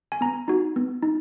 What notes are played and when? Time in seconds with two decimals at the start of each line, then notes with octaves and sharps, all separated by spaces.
0.12 G#5
0.21 B3 A#5
0.48 D#4 F#4
0.76 B3
1.03 D#4